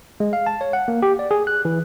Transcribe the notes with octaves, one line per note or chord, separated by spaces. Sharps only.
G#3
F5
A5
C#5
F#5
A#3
G4
D5
G#4
F#6
E3